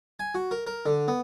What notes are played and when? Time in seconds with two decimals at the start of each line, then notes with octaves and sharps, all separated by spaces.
0.19 G#5
0.35 F#4
0.51 A#4
0.67 A#4
0.86 D3
1.08 B3